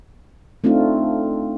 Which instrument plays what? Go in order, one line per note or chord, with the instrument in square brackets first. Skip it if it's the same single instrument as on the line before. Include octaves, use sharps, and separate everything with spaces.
[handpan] A3 C4 D4 D#4 F4